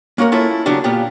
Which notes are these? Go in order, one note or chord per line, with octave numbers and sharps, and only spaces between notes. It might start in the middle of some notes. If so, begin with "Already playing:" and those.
A#3 C#4 F#4 A#4
A#3 C#4 E4 F4 A4 E5
C#3 F#3 G3 B3 D4
A#2 B3 F4 G4